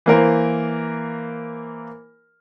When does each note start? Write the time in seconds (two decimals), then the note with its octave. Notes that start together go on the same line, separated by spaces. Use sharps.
0.06 E3 A#3 A#4 C5